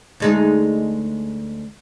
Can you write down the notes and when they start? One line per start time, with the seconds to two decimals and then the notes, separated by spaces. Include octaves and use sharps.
0.20 D2 G#3 D#4